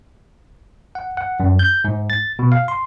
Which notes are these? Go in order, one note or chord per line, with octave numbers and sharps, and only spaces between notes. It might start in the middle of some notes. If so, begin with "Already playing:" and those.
F#5
F#5
F#2
G6
G#2
A6
B2
F5
C6